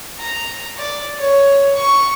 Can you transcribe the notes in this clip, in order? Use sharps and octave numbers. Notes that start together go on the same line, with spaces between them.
A#5
D5
C#5
C#6